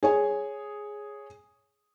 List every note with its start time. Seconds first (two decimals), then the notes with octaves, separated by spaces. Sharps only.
0.03 G#4 C#5 G#5